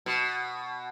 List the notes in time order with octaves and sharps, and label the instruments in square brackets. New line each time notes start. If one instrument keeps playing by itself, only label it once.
[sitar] B2